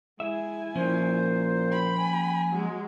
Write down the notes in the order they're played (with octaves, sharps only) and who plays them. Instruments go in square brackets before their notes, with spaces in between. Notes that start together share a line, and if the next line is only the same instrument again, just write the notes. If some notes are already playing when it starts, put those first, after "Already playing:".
[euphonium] G#3 [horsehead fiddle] E4 G#5 [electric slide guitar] G#4 E5
[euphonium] A#2 [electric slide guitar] F3 A#3 C#4 [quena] C5
[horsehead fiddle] G5 B5
[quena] G#5
[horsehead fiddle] F#3 G#3